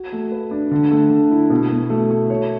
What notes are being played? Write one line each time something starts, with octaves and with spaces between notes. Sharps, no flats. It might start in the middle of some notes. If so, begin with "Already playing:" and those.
Already playing: F#4
A3
B4
D4
D3
A3
D3
E4
B2
B2
A3
A3
C#5